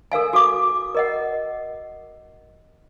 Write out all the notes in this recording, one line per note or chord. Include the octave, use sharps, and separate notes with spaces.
A4 A#4 F5 G#5
F#4 A4 F5 D6
A#4 D#5 F#5